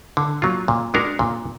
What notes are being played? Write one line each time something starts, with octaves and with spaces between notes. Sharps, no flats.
D3
F#3 A#3 F4
A#2
G#3 D4 F#4 A#4
A#2